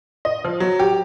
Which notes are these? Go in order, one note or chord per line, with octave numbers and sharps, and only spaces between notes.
D#5
F3
F#3
G4